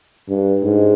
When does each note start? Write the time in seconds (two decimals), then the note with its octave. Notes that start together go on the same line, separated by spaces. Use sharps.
0.29 G2
0.64 G#2